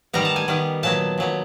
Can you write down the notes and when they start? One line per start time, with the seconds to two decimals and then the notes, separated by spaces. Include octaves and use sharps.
0.13 D#3 G3 B3 A#5
0.25 A5
0.36 G#5
0.48 D#3 G3 B3
0.83 A#2 F#3 B3 A5
1.18 A#2 F#3 B3